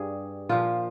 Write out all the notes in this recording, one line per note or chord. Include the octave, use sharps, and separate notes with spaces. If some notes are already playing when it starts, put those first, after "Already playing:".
Already playing: G2 G3 G#4
A#2 F3 F4